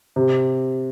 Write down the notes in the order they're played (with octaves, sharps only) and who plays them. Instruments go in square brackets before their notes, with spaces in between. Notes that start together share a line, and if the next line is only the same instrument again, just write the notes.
[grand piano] C3